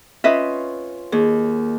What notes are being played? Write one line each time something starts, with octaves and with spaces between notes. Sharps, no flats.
C#4 F4 B4 D#5 E5
D#2 G#4